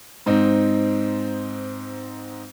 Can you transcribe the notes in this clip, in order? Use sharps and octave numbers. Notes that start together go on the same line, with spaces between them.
G#2 C4 D#4